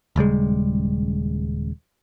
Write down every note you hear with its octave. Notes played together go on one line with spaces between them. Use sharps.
D#1 C#3 G3 G#3